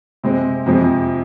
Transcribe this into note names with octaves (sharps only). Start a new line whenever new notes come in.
C3 G#3 C4
F2 C3 F3 G#3